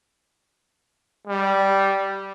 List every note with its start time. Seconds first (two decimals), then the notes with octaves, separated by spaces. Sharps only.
1.27 G3